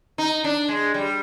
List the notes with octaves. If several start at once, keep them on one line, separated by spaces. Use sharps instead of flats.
D#4
D4
G#3
G3